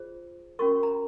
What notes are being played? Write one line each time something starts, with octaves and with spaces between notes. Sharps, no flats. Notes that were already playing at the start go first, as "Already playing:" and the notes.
Already playing: F4 G#4 C5
C#4 F#4 A#4 C#6
A#5